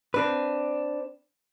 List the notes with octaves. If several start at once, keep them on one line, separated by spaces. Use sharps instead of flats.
C4 D4 B4